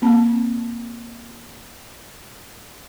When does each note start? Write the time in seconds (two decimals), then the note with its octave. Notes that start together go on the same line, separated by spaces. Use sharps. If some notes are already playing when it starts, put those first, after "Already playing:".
0.02 A#3 C4 A5